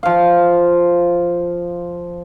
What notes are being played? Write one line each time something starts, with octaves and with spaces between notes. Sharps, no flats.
F3 F5